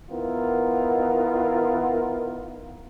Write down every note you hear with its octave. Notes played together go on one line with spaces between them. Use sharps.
D#3 B3 E4 F4 A#4